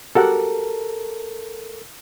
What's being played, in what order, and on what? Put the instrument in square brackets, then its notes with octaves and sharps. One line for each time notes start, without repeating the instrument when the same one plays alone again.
[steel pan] F#4 G4 F#5 [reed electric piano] A4 A#4